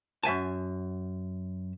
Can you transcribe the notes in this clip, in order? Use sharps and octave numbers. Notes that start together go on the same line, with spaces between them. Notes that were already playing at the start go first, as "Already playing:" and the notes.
F#2 E5 G#5 A5